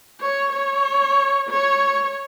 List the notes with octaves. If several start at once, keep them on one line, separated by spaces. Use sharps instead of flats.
C#5
C#5
C#5